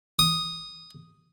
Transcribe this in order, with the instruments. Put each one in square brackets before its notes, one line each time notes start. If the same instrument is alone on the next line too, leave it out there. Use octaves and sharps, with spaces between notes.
[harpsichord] D#6